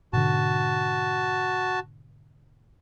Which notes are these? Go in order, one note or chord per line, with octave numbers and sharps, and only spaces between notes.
G#2 B2 D3 F#4 A5